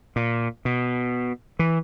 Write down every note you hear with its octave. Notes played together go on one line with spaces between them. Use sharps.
A#2
B2
E3